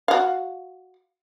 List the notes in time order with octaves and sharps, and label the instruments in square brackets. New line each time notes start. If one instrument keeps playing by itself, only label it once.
[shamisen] F#4 F5